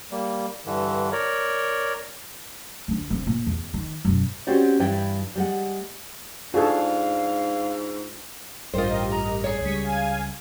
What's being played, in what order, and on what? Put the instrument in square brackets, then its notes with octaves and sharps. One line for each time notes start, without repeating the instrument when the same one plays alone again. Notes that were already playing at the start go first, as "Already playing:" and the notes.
[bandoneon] G3 A#3
G2 D3 E3
A#4 C#5 D5
[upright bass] D2 D4
D3 C4
A#2
E2
D#3
F#2 B2
[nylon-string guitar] C4 C#4 F#4 G4 D5
G2 E3 G3 E4 G5
G3 G#3 F#5
[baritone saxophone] G#2 [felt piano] D4 F4 [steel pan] F#4 G#4 A4 [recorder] F5
[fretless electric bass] A1 G2 [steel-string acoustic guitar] F4 C5 [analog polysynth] G4 A#4 D#5
[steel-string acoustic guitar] A#5
G#4 C#5
[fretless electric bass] C#2 G3 [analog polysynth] C#6 D#6 B6
[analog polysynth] F5 G#5 G#6